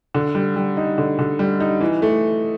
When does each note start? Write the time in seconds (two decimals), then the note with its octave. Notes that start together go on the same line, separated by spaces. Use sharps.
0.15 D3
0.35 G3
0.56 G3
0.77 D#4
0.98 D3
1.19 D3
1.39 G3
1.60 D#4
1.81 E3
2.02 A3